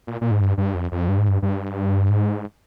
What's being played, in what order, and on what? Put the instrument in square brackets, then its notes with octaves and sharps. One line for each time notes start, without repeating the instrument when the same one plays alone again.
[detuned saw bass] A#2
A#2
G#2
G2
G2
F2
F2
G2
G#2
G2
G2
G#2